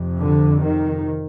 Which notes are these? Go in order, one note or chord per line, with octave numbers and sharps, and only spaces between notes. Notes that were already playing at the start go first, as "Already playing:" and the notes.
Already playing: F2 C3
D3
D#3